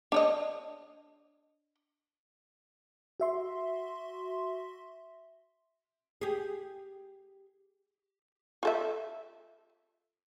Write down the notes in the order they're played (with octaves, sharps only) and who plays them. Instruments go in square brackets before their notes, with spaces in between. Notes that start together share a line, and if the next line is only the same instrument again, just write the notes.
[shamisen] D4 C#5 D#5
[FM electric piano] F#4 E5 C6
[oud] G4 G#4
[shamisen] F4 A4 E5